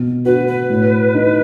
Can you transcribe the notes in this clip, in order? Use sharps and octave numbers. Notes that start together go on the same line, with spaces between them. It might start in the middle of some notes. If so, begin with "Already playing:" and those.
Already playing: B2
F#4 B4
B4
A2
D#4